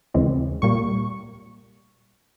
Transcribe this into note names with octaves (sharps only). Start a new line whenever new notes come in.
D#2 C#3 E3 G#3 C4
C2 A#2 G3 A#3 C#6